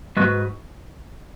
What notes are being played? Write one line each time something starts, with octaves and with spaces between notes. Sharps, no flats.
G#2 G#3 F#4 B4